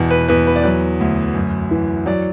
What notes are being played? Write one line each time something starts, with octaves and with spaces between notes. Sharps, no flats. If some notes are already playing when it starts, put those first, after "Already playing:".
Already playing: E2 B2
B4
E2 B4
B4
D5
F#3 B4
D2
F#2
E3
F#3 D5